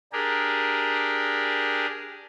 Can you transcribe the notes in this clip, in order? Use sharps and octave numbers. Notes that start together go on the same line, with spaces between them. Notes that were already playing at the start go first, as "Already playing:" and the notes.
D4 G4 G#4 A#4